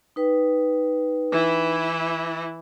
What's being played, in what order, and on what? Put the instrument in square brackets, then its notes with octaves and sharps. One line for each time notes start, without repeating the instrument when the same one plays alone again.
[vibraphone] D#4 B4 G5
[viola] E3 E4